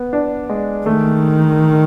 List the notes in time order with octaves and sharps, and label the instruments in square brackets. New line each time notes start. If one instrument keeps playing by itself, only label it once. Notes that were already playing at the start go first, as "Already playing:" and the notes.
Already playing: [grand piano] B3
D4
G#3
[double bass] D#3 [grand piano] A3